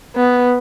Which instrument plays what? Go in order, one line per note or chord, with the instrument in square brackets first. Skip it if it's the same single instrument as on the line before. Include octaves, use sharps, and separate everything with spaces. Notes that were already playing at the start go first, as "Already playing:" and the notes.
[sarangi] B3